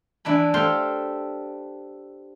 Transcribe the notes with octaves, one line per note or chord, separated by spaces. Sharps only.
E3 D4 G#5 B5
G4 A4 C5 F5 C6